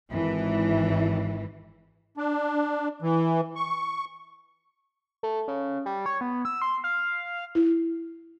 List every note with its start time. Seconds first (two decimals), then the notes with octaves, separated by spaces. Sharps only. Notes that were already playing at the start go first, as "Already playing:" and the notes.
0.11 G#1 E3
2.17 D4
3.02 E3
3.56 C#6
5.23 A3
5.48 C#3
5.86 G3
6.06 C#5
6.21 B3
6.45 E6
6.62 C6
6.84 F5
7.55 E4